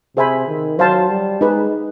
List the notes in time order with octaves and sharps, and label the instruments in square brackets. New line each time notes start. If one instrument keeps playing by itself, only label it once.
[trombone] C3 [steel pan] G#4 C5 E5 G#5 B5
[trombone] D#3
[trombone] F#3 [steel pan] C5 F5 A5 C6
[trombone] G3
[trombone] G#3 [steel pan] D#4 G#4 B4